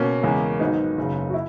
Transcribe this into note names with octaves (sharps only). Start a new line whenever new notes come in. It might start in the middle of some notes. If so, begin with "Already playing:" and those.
Already playing: B2 A#3 C#4
E2 C#3 G#3
G#1 G#2 D#3 F#3 B3 D#4
F#1 F#2 C#3 F#3
F#4
E4